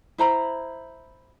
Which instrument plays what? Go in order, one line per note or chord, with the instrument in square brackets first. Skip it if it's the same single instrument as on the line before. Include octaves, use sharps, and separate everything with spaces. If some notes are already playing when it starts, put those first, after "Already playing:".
[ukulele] E4 C5 A#5 B5